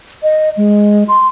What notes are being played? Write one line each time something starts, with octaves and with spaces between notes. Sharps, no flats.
D#5
G#3
C6